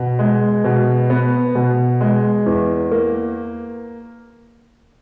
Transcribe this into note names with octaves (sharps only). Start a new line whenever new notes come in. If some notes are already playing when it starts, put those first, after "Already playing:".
Already playing: B2
G#3
B2
B3
B2
G#3
E2
A#3